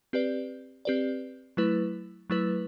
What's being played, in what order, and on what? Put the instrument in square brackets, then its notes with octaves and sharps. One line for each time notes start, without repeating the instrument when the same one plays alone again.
[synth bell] C4 G4 B4 D5
C4 G4 B4 D5
F#3 A3 E4 B4
F#3 A3 E4 B4